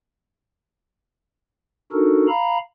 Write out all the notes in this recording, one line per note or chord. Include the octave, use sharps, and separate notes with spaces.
D4 D#4 F#4 A4 A#4
F5 A#5 B5